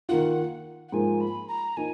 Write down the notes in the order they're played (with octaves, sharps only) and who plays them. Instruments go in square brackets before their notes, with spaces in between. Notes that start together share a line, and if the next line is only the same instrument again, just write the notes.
[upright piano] D#3 A#3 F4 [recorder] F#5
[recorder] F#5
[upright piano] G#2 F3 A#3 [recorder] G#5
[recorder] B5
A#5
[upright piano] F3 A#3 D#4 [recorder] G#5